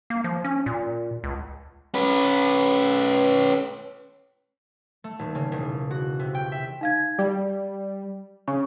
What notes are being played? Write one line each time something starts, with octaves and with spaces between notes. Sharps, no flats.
A#3
F3
C#4
A#2
C#2
C#4 B4
A3
D#1
C#3
E1
F#4
C3
G5
E5
D#4 F5 G#6
G3 D5
C#3 C#6